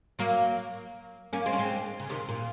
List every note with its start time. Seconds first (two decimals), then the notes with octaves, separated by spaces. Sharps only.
0.19 F#3 A#3
1.33 A#3 C#4
1.46 G#3 C4
1.53 C#4
1.59 G#3 C4
2.00 C#3
2.10 C3 D#3
2.29 A#2